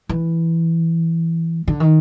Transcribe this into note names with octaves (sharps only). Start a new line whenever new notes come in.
E3
D3
D#3